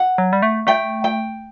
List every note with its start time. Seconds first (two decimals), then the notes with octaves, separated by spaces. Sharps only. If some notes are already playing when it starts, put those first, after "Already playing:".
Already playing: F#5
0.18 F#3
0.33 G3
0.42 A3
0.67 A3 G5
1.04 G5